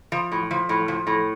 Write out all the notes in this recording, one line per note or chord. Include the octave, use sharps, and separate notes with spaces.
F3
A2
F3
A2
F3
A2